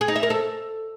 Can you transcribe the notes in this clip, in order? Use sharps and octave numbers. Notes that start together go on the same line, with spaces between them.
G#4
D#4
E5
A#4
A4